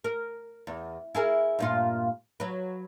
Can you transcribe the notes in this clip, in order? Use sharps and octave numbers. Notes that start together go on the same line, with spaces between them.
A#4
E2
E4 G#4 A#4
G2 A#2 F4
F#3 B4